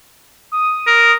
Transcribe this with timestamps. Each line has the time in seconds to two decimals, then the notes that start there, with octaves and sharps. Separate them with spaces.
0.52 D#6
0.87 A#4